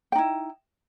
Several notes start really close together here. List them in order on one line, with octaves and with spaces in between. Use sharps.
G5 D#4 E4